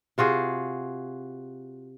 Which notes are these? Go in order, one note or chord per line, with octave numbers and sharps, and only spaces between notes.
C3 F4 F#4 G#4